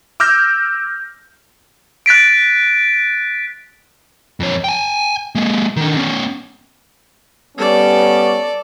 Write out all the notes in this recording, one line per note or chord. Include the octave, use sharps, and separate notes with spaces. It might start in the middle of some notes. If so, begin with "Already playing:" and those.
D6 E6 F6 G6 A#6
F#6 A6 B6 D7
F2 C#5
G5 G#5
G#3 A#3
D3 D#3
B3 C#4
G3 B3 C#4 A4 D5